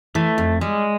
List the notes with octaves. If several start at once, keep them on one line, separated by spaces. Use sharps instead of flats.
E3 A3
F2
G3 G#3